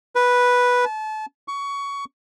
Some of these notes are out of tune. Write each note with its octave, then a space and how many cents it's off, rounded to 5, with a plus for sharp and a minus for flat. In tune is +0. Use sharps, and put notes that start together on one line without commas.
B4 -5
A5 -30
C#6 +20